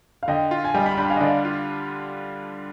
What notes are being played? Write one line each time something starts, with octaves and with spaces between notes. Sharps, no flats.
F5
D3 D#5 G5
F4
G#5
G3 D#5 G5
G5 B5
D4 G5 B5
F5 G#5
D#5
D3 D5 F5
F4